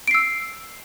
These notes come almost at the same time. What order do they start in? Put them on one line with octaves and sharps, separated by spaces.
D7 C7 E6